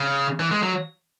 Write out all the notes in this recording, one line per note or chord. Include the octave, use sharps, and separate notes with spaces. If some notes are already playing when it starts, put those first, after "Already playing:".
Already playing: C#3
E3
G#3
F#3